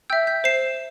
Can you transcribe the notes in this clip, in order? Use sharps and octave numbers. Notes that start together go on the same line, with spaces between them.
E5 G5 E6 G6
G6 B6
C5 C7 E7